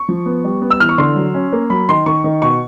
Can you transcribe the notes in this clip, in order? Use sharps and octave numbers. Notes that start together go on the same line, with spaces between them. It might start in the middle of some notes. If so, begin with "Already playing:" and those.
Already playing: C#6
F3
B3
G3
B3
E6
E3 F6
C#6
D3 C6
F#3
C#4
A#3
F#3 B5
D#3 C6
D#3 C#6
D#3
B2 C#6